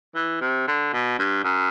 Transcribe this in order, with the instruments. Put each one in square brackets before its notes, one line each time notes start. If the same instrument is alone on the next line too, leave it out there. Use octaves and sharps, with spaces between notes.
[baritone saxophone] E3
C3
D3
B2
G2
F#2